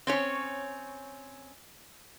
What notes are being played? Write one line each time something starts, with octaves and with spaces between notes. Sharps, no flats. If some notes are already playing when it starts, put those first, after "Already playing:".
C4 C#4 C#5